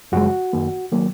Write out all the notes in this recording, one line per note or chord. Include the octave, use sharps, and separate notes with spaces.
F#2 C#3 F3 G#3 F#4
F#2 D#3 A#3
D#3 F#3 A#3